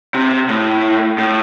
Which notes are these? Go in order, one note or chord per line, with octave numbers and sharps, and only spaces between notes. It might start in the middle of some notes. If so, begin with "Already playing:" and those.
C3
A2
A2